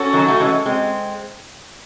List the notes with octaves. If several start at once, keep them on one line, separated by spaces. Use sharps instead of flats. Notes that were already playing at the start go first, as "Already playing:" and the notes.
Already playing: C#4 F#4 A4
D#3 F#3
A3
E3 G#3
G#3 C4